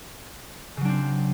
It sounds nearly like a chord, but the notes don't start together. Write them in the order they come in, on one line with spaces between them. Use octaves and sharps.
C#3 F#3 D4 C4